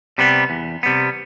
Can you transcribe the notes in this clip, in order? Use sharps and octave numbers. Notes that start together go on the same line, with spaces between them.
C3 G3 B3
E2
C3 G3 B3